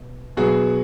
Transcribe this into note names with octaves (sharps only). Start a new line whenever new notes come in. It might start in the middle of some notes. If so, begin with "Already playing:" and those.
Already playing: B2
B2 F#3 B3 F#4 G#4